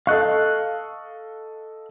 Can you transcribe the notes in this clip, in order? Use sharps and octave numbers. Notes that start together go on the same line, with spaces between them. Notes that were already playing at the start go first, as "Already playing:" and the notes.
A4 D#5 F5 C#6 F#6